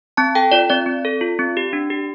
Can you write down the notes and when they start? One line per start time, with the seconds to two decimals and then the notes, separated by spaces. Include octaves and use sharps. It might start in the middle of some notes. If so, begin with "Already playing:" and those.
0.17 C4 A5
0.35 A4 G5
0.52 F4 D5
0.70 C4 D5
0.86 C4
1.05 A4
1.21 F4
1.39 C4
1.57 G4
1.73 D4
1.90 G4